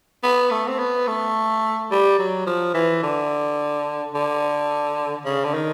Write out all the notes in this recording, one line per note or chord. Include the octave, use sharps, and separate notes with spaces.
B3
A3
C4
B3
A3
G3
F#3
F3
E3
D3
D3
C#3
D3
D#3